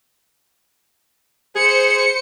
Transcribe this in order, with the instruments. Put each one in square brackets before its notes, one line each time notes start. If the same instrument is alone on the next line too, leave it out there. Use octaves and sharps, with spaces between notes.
[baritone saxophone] G#4 [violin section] C5 C#7